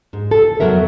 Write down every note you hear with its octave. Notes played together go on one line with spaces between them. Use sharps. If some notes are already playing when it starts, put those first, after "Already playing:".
G#2
A4
F2 C#3 F#3 B3 A#4 E5